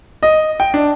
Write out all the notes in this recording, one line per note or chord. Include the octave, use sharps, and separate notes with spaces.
D#5
G5
D4